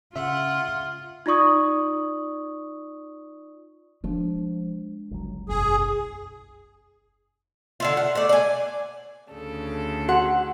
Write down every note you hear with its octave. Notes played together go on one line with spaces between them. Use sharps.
C#3 F4 E5 F#5
D#4 F4 D5 C#6 D#6
F3 G#3 D4
G1 C#2 F#3
F#1 B1 E2 B2 G#4
D3 E4 F4
F#5
A3 D5
D5 G#5
D2 C#3 A4
F#4 F#5